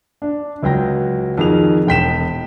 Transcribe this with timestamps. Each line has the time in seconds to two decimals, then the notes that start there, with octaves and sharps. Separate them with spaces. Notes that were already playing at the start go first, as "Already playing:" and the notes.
0.22 D4
0.63 C#2 F#3 G5 A#6
1.37 F2 D#3 G#4 F7
1.87 E1 G5 B6 E7